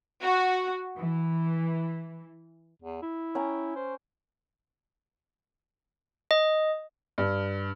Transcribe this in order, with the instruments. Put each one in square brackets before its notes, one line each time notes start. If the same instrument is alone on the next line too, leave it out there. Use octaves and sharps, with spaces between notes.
[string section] F#4
E3
[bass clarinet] E2
E4
[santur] C#4 G5 A#5
[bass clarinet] C5
[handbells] D#5
[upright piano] G2